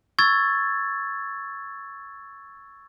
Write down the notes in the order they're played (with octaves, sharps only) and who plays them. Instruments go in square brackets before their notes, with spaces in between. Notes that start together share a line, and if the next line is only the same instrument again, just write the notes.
[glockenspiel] C#6 E6 G#6 A6